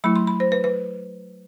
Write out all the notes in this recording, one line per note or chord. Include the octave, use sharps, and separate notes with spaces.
F#3 A3 E4 B5
C6
B5
C5
B4
B4